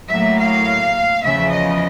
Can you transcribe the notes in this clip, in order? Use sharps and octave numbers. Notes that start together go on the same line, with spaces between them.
A2 F#3 A#3 E5
F5
E2 C#3 F3 E5
D#5